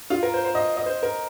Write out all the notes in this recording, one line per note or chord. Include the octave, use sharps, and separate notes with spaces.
F4
A#4
C5
C5
D#5
D#5
C5
A#4